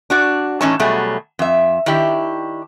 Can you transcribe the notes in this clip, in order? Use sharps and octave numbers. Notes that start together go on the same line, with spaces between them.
D4 F#4 D5
A2 E3 C#4 D#4 C#5 A5
B2 F#3 G3 A3 G#4
F2 E5
D#3 D4 E4 G4